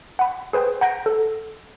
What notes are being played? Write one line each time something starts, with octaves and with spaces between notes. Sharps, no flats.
F#5 B5
G#4 B4 C5 G5
F#5 A#5 G6 A#6 D7
A4